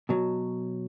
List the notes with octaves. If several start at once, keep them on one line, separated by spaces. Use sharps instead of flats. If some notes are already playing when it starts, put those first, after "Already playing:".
B2 F#3